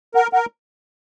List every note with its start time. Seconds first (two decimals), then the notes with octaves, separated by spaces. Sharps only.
0.15 A#4 F#5
0.33 A#4 F#5